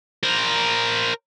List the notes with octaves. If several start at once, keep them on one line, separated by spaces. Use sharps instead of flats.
A#4 C5